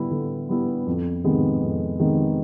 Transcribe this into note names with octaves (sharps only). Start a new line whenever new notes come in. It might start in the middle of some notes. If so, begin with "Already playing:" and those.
Already playing: D3 G3 B3 E4
D3
G3 B3 E4
F2
C3 D#3 G#3 B3
F2
C3 D#3 G#3 B3